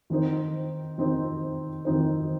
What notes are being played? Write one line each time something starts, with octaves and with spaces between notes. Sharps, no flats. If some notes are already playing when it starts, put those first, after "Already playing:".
D#3 C4 D#4 C5
D#3 C4 D#4 C5
D#3 C4 D#4 C5